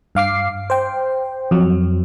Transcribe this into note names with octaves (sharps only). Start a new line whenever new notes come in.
G2 F5 D6 C7
C5 G5
F2 F#3